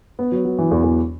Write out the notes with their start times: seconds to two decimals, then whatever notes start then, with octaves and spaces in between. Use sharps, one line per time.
0.19 B3
0.32 F#3
0.45 F#3
0.58 E3
0.71 E2
0.83 E2